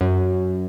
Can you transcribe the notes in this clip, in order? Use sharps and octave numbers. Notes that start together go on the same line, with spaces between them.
F#2